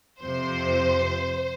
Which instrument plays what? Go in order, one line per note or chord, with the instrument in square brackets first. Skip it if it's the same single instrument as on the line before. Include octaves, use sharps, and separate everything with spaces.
[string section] F2 C3 F3 C5